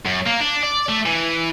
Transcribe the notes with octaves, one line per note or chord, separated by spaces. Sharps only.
F#2
A#3
D4
D5
A3
E3